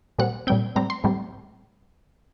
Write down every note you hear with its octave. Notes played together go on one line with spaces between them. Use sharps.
A#2 G3 C4 F#5
A#2 G3 C4 G5
A2 G3 C4 A#5
C6
A2 G3 C4